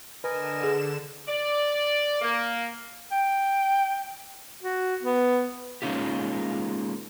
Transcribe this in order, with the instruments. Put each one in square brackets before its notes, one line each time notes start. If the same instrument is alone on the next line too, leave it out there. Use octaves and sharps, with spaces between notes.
[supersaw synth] D3 E7 [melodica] A#4 D#5 G#5 [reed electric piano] B4
[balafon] G#4
[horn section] D5
A#3
[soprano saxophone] G5
F#4
B3
[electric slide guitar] G#3 A#3 C#4 D#4 F4 G4